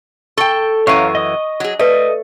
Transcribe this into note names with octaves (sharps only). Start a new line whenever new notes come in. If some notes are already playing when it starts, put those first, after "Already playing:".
A4 G5 C#6 G7
F#2 E3 C#5 F5 A#5 C#6 D#7
D#5 D#6
F#3 G#4
A3 B4 D5 D#5